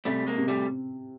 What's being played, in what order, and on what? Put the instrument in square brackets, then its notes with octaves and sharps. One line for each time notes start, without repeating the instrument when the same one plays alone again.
[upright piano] C3 [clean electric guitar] G3 A3
[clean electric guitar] G#3 A#3
[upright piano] C3
[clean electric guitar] G3 A3